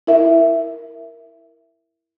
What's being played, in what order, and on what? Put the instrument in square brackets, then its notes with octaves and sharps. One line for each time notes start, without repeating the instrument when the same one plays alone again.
[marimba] E4 A#4 E5